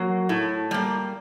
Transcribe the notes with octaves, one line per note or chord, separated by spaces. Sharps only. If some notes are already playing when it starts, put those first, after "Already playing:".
Already playing: F#3 A#3
A2
G3 A#3